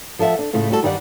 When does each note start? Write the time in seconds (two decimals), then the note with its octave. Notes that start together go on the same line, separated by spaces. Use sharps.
0.19 F3 A4 D#5 E5 F#5
0.39 D4
0.53 A2 C#3 A3 F4
0.70 G3 F#4 A4
0.83 G2 D#3 G3 D#4 D5 F#5